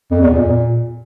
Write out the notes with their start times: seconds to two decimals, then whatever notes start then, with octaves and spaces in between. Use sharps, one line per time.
0.11 F2
0.21 E2
0.31 A#2